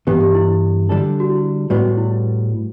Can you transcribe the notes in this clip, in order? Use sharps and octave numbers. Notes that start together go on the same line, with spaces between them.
G2 E3 B3 G4
G4
E4
D3 G3 D4 A4
F#4
E4
A2 G3 B3 F#4
E4
E4